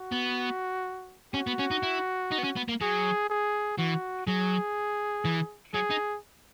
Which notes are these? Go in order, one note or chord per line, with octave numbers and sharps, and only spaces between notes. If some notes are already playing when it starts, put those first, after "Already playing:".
Already playing: F#4
B3
C#4 F#4
B3
C#4
D#4
E4
D#4
B3
C#4
B3
A#3
F#3 G#4
G#4
E3 F#4
F#3 G#4
E3
F#3 G#4
D#4